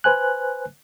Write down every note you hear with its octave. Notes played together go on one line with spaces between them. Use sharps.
B4 C5 G#5 F#6